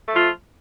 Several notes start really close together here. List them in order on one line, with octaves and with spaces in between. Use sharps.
A3 F3 F4